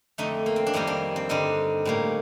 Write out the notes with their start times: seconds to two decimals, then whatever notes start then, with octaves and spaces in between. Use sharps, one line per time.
0.18 F2 D3 A3 D#4
0.46 A#3
0.56 C4
0.67 D4
0.74 F2 D#3 G3 A#3 D#4
0.87 D4
1.16 C4
1.29 G2 D3 G3 D#4
1.85 A2 G3 A#3